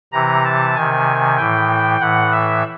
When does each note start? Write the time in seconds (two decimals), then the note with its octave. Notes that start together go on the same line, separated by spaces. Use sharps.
0.13 C3 E3 A#5
0.45 A5
0.75 C3 D#3 G#5
1.37 A2 E3 G5
2.00 A2 E3 F#5
2.31 E5